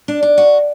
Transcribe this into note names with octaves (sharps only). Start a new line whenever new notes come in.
D4
D4
F#4